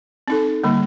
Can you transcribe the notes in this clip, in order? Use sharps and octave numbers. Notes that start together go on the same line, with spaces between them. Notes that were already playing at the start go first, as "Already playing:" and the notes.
C4 D#4 A4
D3 G3 A#3